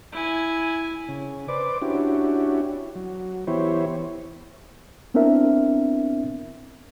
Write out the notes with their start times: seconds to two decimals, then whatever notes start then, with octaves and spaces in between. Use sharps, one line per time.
0.12 E4 G#5
1.09 C#3
1.48 B4 C5 D5 D6
1.82 C#4 D4 E4 F#4 G4
2.95 F#3
3.47 E3 B3 E4 G4 C5 C#5
5.14 B3 C4 D4 E4 A#4 E5